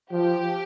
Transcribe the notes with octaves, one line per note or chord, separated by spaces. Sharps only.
F3 G4